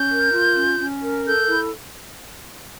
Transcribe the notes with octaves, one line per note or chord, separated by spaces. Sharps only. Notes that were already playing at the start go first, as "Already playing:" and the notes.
Already playing: C#4 G6
A#4
F4
C#4
C#4
A#4
A4 G6
E4